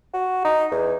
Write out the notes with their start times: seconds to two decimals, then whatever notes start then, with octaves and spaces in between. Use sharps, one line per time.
0.14 F#4
0.45 D#4
0.71 E2